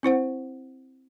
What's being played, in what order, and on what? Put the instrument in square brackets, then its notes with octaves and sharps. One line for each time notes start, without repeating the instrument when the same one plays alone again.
[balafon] C4 E4 C5 F#5